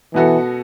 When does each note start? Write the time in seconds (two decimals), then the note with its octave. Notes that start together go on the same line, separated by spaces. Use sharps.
0.14 B2 E3 B3 F#4 A4